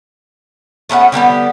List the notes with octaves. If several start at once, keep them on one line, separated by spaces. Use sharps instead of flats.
A3 B3 C#4 F#5
D3 G3 B3 G4